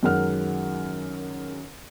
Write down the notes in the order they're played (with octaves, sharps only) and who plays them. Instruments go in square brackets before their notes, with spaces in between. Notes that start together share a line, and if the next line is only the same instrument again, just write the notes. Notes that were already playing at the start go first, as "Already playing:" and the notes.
[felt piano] F#2 D#3 G#3 A#4 F#5 F6